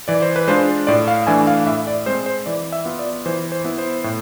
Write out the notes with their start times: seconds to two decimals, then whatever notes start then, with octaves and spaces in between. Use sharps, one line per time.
0.08 E3 D5
0.22 C5
0.36 B4
0.47 G#3 D4 F4 C5
0.87 A2 D5
1.08 F5
1.27 E3 A3 D4 G#5
1.47 F5
1.66 A2 E5
1.87 D5
2.06 G#3 C4 C5
2.26 C5
2.46 E3 D5
2.72 E5
2.85 B3 F4
2.99 D5
3.26 E3 C5
3.52 C5
3.65 B3 E4
3.78 C5
4.04 A2